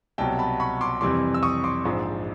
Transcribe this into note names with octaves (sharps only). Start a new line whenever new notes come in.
C2 B2 F#3 G5 A5
A5 B5
B5 C#6
C6 D6
F2 C3 E3 G3 C6 D6
E6
C#6 D#6
C6 D6
A#1 G#2 F3